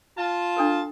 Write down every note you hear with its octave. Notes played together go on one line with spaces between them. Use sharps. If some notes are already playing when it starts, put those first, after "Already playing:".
F4 A5
D4 A4 A#4